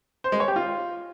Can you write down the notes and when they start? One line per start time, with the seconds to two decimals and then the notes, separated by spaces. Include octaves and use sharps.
0.24 C5
0.32 G#3
0.40 C#5
0.48 G4
0.56 F4